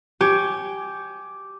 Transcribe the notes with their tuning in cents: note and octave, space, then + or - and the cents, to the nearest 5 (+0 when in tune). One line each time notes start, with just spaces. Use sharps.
G4 -5 C#5 +0 G#5 +20